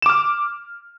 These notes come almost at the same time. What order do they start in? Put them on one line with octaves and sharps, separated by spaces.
E7 D6 F6